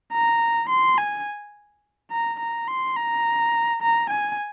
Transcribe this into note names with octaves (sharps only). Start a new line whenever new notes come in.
A#5
C6
G#5
A#5
A#5
C6
A#5
A#5
G#5